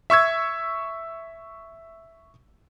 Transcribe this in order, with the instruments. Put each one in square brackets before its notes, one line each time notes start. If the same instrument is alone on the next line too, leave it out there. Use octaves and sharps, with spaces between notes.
[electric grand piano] E5 C#6 E6 G#6